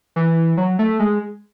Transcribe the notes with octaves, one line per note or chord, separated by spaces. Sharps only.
E3
F#3
A3
G#3